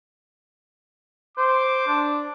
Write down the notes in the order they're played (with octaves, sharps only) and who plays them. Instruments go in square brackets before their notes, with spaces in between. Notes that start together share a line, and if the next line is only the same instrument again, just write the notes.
[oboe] C5 [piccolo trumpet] D6
[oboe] D4